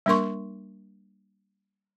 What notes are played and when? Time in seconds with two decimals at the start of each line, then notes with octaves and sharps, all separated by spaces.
0.06 G3 A#3 D4 A#4 C6 C#6